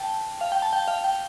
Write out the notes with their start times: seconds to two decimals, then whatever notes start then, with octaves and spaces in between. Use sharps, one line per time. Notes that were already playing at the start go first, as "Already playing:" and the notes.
Already playing: G5 A5
0.41 F5
0.52 G5
0.62 A5
0.73 G5
0.88 F5
1.04 G5